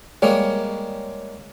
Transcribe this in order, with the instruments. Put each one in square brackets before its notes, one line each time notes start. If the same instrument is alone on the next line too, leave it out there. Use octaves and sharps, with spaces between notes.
[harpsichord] G3 G#3 A#3 [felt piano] C#5